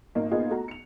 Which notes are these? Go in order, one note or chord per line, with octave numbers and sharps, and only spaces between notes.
G#1 A#3 D#4
A#3 B3 D#4 F4 G#4
A3 F#4 A#5
C#7 F7